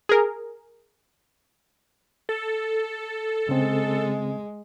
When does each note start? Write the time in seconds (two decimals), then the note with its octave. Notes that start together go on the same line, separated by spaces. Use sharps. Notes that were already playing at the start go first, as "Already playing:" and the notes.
0.09 G#4 A#4
2.29 A4
3.49 C#3 G#3 C4